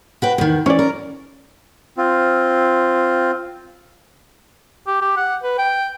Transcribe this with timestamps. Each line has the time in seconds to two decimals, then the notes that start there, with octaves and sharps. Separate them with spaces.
0.22 F#4 B4 G5
0.38 E2 D#3
0.66 E3 C#4 D5
0.79 A#4
1.97 C4 F4
4.87 G4
5.02 G4
5.17 F#5
5.43 B4
5.58 G5